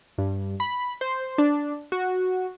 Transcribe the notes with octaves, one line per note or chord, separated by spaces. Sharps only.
G2
B5
C5
D4
F#4